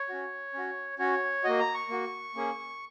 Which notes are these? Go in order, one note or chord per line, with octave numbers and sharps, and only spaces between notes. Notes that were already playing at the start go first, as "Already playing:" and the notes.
Already playing: C#5
C#4 F#4
C#4 F#4
C#4 F#4 C#5
A#3 F#4 D#5
A#5
C#6
A#3 F#4
A#3 C#4 G#4